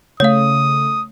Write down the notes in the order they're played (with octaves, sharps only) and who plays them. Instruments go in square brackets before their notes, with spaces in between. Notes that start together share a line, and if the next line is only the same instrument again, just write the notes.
[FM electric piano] C#3 A3 [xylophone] C#5 F5 [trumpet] D#6